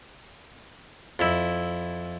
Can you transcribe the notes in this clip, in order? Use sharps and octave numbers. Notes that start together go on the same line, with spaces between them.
F2 E4